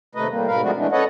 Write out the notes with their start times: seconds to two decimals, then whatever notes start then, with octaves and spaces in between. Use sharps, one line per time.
0.15 D#2 C3 A3 D#4 B4 D#5
0.29 A2 G3 A#3
0.47 G#2 B2 A#4 B4 F5
0.62 F3 G#3 A3 C4 D4 F#4
0.76 E3 G#3 A3 D4
0.92 C#4 A4 B4 C#5 D#5 F#5